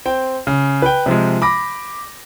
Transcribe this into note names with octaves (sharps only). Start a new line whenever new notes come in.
C4 G5
C#3
B4 G5
C3 F3 G#3
B5 D6 A#6